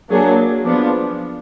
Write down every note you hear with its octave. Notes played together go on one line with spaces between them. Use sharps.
F#3 A#3 D4 G#4
F3 B3 D4